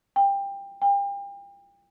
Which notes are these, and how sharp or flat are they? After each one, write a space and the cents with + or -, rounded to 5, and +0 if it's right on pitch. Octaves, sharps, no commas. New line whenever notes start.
G5 +20
G5 +35